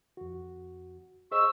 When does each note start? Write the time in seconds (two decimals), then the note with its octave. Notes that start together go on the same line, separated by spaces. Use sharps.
0.17 F2 F#4
1.31 G#4 C5 D#5 C#6 E6